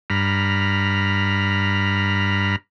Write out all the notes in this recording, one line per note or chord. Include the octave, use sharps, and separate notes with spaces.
G2 A#5 B5 F6